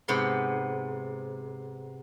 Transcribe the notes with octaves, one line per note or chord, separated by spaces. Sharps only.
G#2 C3 B3 B5 C6